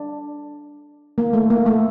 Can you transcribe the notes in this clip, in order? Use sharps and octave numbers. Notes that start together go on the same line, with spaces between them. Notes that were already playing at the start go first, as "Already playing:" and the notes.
Already playing: D4
A#3
A3
A#3
A3